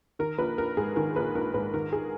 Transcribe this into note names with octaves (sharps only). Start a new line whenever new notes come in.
D#3 A#4
A#1 B4
A#1 A#4
G#2 G#4
D#3 A#4
A#1 B4
A#1 A#4
G#2 B4
D#3 A#4
G#4